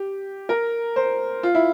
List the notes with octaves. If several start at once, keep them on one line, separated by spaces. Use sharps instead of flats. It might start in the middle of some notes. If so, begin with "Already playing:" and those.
Already playing: G4
A#4
C5
F4
E4